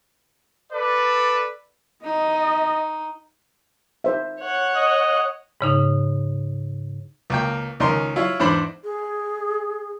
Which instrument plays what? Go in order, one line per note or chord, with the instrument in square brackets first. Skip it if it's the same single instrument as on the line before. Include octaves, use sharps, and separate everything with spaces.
[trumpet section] A4 B4 D5
[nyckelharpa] D#4 [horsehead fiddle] D#5
[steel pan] D#4 C5 E5
[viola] C#5 F#5
[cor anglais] D#5
[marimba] G#2 C#3 D#4
[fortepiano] C#2 A#3 G5
C#2 D#3 C#4 A#4 C6
E4 F4 C#5
E2 G#2 D4 C5 B5
[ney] G#4